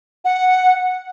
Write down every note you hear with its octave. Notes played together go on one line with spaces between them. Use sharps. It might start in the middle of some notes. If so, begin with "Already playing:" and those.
F#5